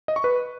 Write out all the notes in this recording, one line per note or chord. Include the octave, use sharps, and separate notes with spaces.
D#5
C#6
B4